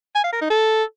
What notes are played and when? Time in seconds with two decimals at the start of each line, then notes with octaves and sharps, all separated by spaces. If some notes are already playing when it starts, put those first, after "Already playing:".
0.15 G#5
0.24 F5
0.32 A#4
0.41 D#4
0.50 A4